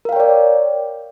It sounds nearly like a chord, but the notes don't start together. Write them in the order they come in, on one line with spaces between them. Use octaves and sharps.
A#4 F5 G5 C#5 D5